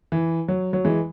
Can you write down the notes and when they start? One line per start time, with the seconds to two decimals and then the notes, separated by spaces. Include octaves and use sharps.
0.12 E3
0.48 F#3
0.73 F#3
0.84 E3 G#3